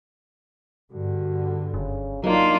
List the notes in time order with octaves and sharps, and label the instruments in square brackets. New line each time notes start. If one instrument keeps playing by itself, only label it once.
[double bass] G2 D3 [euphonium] F#4
[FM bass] F#1 [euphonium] C#3
[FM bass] F#3 [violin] A#3 F4 [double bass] D4 [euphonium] D#4